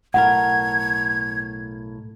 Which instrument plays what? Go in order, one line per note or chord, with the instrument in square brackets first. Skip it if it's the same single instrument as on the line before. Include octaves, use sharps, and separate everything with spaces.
[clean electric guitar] B1 A2 A#4 [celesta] F#5 [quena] G#6